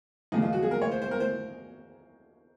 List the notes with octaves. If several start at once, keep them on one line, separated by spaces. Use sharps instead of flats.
D#2 C#3 F3 A#3 D#4
F4
F#4
G#4
A#4
C#5
C5
C5
A#4
C5